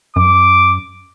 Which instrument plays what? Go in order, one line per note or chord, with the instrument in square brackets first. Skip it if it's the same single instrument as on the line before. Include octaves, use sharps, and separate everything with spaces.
[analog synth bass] F#2 [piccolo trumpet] D6